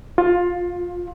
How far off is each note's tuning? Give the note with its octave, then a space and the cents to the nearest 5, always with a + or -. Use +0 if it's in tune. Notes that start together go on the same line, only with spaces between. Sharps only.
F4 +20